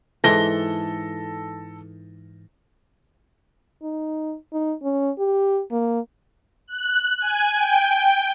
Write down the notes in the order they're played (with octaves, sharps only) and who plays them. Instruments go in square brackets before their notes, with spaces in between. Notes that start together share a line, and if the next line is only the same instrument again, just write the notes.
[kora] G#2 E3 [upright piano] A4 A#6 G7
[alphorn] D#4
D#4
C#4
G4
A#3
[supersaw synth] F#6
G#5
G5